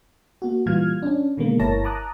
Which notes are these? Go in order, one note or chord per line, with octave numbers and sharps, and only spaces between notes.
A#3 F#4
A#2 E3 G3 F4 F6 G#6
C#4 D4
B2 D3 D#3 G#3 A#3
G1 E4 A#4 C#5 A5 A#6
A5 A#5 D6 D#6 F#6